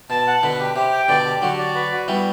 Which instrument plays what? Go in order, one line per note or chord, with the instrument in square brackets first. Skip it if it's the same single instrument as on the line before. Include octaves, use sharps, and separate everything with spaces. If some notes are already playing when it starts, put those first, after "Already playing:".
[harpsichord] B2 [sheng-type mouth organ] A5
[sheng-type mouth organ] F#5
[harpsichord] B2 D3 [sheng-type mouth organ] B4
[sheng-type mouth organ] G4
[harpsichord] C3 [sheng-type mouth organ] G4
[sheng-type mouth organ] G5
[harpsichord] B2 D3 [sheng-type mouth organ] D5
[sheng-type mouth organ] G4
[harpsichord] D3 F#3 [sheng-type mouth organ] F#4
[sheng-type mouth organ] D5
B4
F#4
[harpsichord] E3 G3 [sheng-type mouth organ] B3